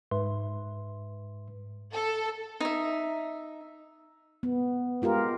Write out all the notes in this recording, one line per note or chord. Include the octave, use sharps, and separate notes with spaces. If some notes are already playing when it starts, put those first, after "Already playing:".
G#2 B4 E5 C6
A4
D#4 E5
B3
G#3 F4 G4 A#4